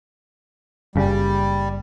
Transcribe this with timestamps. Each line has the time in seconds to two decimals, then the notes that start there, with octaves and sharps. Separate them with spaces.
0.96 F#1 C#3 G3